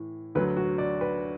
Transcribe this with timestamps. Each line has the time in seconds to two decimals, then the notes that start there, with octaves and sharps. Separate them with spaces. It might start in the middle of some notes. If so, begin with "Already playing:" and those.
Already playing: A2 E3
0.35 D2 D3 F#3 B4
0.57 F#4
0.78 D5
1.01 B4